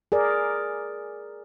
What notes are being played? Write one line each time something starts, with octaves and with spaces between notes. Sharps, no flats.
G#4 A#4 D5